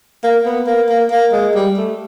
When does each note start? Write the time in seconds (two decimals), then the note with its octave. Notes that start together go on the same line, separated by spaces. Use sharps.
0.24 A#3
0.46 B3
0.67 A#3
0.89 A#3
1.11 A#3
1.32 G#3
1.55 G3
1.77 A3